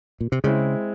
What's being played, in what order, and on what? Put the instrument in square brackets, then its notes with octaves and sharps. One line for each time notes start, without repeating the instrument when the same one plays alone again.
[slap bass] A#2
C3
[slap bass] C#3 [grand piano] G#3 C4 E4